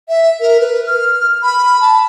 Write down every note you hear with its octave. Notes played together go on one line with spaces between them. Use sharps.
E5
A#4
B4
F6
B5
A5